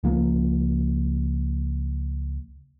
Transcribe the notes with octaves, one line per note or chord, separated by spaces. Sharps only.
C#2 F3 A#3